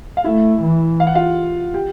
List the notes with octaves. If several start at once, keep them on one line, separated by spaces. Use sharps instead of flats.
F5
A3 E4 E5
E3
F5
F#5
F4 F5
G4 G5